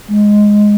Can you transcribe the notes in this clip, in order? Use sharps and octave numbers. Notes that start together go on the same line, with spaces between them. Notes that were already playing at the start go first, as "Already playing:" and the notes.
G#3